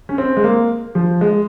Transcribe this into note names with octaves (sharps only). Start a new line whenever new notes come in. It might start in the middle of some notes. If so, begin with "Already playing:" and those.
C#4
C4
G#3
A#3
F3
G#3